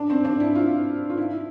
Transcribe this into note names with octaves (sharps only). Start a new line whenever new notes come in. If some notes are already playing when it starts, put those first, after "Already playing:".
Already playing: D4
C4
D4
E4
F4
F4
E4